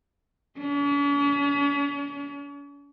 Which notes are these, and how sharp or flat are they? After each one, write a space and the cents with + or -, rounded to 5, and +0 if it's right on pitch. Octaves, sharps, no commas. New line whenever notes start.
C#4 +45